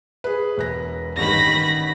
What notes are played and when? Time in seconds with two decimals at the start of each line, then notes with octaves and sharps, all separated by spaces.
0.24 G#4 B4
0.57 E1 B4 A#6
1.17 A1 G2 D#3 B5 A#6